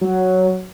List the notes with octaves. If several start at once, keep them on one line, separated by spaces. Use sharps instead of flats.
F#3